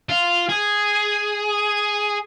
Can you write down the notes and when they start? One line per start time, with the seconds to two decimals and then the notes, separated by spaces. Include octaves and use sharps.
0.09 F4
0.49 G#4